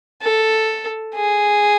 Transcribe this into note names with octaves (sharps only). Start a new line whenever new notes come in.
A4
G#4